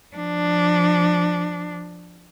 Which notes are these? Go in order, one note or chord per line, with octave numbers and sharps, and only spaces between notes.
F3 D4